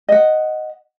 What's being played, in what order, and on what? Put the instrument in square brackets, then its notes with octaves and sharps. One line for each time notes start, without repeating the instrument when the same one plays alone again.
[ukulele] D#5 F#5